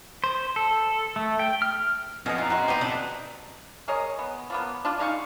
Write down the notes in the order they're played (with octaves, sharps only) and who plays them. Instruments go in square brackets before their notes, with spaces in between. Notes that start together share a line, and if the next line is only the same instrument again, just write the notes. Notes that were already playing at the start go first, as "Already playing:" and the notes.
[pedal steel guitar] C5
A4
A3
G5
F6
[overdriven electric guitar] F2 [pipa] B2 D#5 [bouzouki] C#4
[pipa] E3 [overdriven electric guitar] F4 A#5
[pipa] G#3 F#4
[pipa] G3 [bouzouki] D#4 B4 G5
[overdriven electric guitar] B2 C4 [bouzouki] D4
[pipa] G#4 A#4 C#5 D#5
B3
F3 A#3 B3
D4 F4
G#3 D#4 F5 C#6